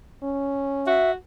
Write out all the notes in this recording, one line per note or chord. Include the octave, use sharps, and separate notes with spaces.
C#4
F#4 E5